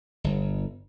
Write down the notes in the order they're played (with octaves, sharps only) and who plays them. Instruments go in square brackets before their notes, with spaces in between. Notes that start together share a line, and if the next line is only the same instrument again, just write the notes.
[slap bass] G1